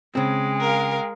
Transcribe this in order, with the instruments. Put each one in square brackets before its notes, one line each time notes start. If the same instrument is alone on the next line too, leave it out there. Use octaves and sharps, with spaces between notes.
[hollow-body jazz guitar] C#3 C4 [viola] G#3 [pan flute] G5
[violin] A#4 F5